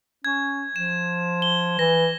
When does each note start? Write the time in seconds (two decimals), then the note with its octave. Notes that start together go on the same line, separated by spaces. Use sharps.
0.25 C#4 G#6
0.76 F3 E7
1.42 G7
1.79 E3 A#6